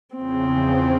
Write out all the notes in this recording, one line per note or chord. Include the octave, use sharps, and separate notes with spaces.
E2 C#3 F3 C4